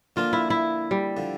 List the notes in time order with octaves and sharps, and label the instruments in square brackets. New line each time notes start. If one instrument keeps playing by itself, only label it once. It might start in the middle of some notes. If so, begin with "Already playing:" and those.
[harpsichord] D3 F3 A#3 D4 [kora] F4
[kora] E4
E4
G3
[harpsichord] D3 F3